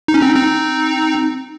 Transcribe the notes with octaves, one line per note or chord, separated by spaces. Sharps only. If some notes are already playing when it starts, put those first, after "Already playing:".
D#4
C#4
C4 D#4
C4 D#4